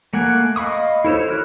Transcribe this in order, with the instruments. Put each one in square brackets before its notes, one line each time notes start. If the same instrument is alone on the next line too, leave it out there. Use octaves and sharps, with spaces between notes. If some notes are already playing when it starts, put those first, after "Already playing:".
[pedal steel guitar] A3 A#3 F#5 G#5
D#5 F5 B5 C#6 D#6
E4 A4 C5 C#5
E3 F#4 A#4 F6 F#6